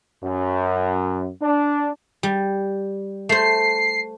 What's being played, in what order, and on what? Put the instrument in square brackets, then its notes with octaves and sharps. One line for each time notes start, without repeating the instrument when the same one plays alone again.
[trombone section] F#2
D4
[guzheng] G3
[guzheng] A3 C5 [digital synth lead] C7